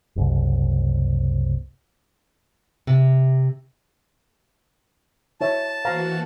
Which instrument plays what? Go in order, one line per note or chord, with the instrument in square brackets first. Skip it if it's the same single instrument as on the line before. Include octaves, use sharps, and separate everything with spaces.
[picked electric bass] F#1 C2
[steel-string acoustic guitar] C3
[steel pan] E4 C#5 E5 [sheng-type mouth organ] A5
[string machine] E3 A#3 F#4 [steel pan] C5 F5 A#5